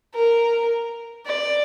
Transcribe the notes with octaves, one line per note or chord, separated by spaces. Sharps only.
A#4
D5